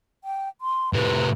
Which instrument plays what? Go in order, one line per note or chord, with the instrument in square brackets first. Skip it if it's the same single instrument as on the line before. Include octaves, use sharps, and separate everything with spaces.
[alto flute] G5
C6
[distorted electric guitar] A2 C3 [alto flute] B4